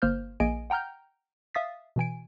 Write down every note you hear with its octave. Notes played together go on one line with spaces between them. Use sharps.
G1 A#3 C5 F6 G6
A#1 A#3 G#4 D#5 G#5 D7
F#5 G5 A#5 F6 G6
E5 F5 D#6 A6 B6
B2 E3 G#5 D7